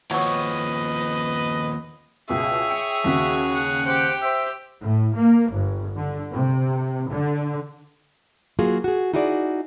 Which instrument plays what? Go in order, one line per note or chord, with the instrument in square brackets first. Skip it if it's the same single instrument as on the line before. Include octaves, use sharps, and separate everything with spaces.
[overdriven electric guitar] D#2 F3 [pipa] F#3 C#5 [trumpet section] B4 D#5
[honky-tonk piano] C#2 B2 [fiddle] G#4 C#5 [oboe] E5
[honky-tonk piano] G5 C#7
[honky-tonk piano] D#2 C#3 B6 [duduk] F#4
[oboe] F#5
[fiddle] G4 G5 [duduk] C5 [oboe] F#5
[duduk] C5 [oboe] E5
[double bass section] A2
A#3
G1
D3
C3
D3
[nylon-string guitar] F#3 A#3 F4 F#4 G#4
F#4 G#4
D#4 E4 F#4 G#4 D5